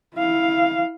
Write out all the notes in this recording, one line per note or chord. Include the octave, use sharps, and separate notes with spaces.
E4 F5